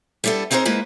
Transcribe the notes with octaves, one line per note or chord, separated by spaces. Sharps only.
G3 B3 D4 E4 A4
B3 C4 D#4 G#4 A#4 C5
G#3 A#3 E4 B4 C5